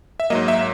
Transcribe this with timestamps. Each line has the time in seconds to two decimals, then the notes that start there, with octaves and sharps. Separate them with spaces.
0.20 E5
0.30 G#2 F#3 A#3 D#5
0.48 E5